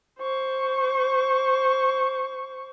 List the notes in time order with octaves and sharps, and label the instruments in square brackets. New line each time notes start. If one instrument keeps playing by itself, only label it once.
[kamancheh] C5 C#6